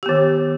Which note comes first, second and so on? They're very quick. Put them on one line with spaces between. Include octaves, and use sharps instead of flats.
G4 B3 D#3